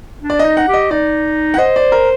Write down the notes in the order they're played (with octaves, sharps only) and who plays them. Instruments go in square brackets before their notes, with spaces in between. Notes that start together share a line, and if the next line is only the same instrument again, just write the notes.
[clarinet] D4
[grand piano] D5
D#5
[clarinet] D#4
[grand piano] F#5
[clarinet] G4
[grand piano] D#5
[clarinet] D#4 [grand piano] D5
[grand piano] F#5
[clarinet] C5 [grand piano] D#5
[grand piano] D5
A#4